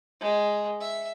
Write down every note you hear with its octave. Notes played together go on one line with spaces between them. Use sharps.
G#3
E5